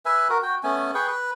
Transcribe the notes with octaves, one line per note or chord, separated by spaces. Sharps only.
B4 E5 G#5
F#4 A#4
F#4 G5
A3 B3 C#4 G#5
G#4 B4 G5 C#6
B4